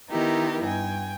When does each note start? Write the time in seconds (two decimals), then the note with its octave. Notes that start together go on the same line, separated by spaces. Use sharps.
0.10 D#3 B3 D#4 E4 G4 A#4
0.63 G2 G5 G#5